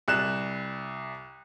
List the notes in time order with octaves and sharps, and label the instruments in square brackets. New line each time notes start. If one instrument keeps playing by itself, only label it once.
[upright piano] C2 F#6 E7